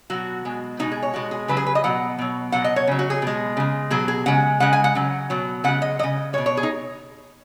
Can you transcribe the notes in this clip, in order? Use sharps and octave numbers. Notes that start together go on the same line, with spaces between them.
B2 F#3 F#4
B2 G#3
B2 G#3 D#4
G#4
C#5
B2 G#3 F#4
G#4
C#3 F#3 B4
G#4
B4
D#5
B2 F#3 F#5
B2 F#3
B2 F#3 F#5
D#5
C#5
C#3 F#3
F#4
G#4
B2 G#3
C#3 G#3
B2 F#3 G#4
G#4
C#3 G#3 F#5
C#3 G#3 F#5
G#5
F#5
C#3 F#3
B2 F#3
C#3 G#3 F#5
D#5
C#3 F#3 D#5
G#3 C#5
B2
C#5
G#4
D#4